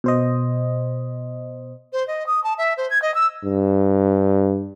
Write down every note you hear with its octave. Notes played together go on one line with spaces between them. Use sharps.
B2 C5 D#5
C5
D#5
D#6
A5
E5
C5
G#6
D#5
E6
G2